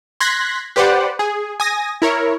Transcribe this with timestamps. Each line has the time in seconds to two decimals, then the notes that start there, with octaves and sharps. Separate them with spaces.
0.20 C6 F#6 G#6 A#6 B6
0.76 G4 B4 C5 D5 F#5
1.19 G#4
1.60 G#5 D#6 A#6
2.02 E4 A#4 C#5